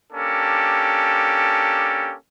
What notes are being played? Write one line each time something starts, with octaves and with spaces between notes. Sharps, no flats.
A#3 C#4 D4 G4 A4